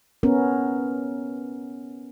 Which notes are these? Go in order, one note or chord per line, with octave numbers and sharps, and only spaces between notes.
B3 C#4 A#4